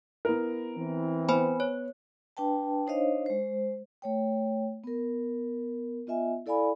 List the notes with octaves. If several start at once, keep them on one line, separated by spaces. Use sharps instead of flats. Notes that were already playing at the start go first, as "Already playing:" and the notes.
B3 E4 A#4
E3 C4
B3 C5 G#5 B5
C#5
D4 B4 G5 A5
D4 D#4 C5 C#5 D#5 F5
G#3 C5
A3 C#5 G5
B3 A#4
B3 F4 D#5 E5 G#5
E4 A4 D5 F5 G#5 B5